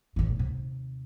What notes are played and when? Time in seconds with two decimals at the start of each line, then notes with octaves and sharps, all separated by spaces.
0.16 A1 C#3
0.38 D#2 C3